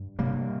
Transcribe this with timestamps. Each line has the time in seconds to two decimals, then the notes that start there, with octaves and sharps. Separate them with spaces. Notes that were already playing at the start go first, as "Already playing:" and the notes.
Already playing: G2
0.19 C3 G3 A#3